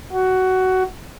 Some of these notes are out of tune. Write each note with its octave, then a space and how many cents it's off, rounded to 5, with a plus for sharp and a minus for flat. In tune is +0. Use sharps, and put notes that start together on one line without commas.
F#4 +15